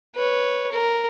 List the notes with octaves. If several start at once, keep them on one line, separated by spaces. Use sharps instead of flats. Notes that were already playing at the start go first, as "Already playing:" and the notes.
B4 C#5
A#4